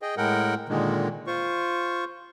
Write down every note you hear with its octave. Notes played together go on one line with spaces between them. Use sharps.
G#4 D#5 G5
A2 G#3 A#4 F#5 G5
A#2 D3 D#3 G#3
F4 C5 C#6